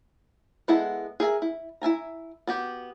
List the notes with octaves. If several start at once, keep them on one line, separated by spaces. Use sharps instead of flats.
G#3 B3 E4 A4 F#5
G#4 A#4 E5 G#5
E4
E4 E5 G#5 A#5
B3 F#4 G4